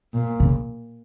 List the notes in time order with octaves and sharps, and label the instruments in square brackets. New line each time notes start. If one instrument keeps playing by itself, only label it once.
[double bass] A#2
[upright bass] C#3